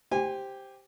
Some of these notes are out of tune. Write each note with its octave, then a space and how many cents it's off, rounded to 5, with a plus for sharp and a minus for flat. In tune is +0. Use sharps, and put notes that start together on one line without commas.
G4 +0 C5 +0 G#5 -25